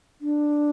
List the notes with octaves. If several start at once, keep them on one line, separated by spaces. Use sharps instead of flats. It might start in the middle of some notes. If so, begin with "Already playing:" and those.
D4